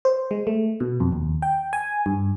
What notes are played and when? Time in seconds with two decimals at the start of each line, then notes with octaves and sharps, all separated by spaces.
0.05 C5
0.31 G#3
0.47 A3
0.80 B2
1.00 F2
1.12 D#2
1.42 G5
1.73 G#5
2.06 G2